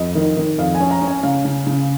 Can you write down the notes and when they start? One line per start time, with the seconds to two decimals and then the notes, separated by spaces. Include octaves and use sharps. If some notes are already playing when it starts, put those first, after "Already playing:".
Already playing: F2 D#5
0.15 D#3
0.37 D#3
0.58 F2 F5
0.75 G#5
0.80 C#4
0.91 A#5
1.02 C#4
1.07 G#5
1.23 C#3 F5
1.45 C#3
1.67 C#3